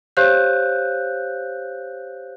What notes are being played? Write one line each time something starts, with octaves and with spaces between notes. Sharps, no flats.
G4 C5 C#5 F5 F#6 G6